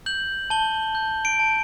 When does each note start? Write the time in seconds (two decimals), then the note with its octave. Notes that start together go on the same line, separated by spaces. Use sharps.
0.06 G6 F#7
0.50 A5 G7
0.95 G6
1.25 D7
1.40 A5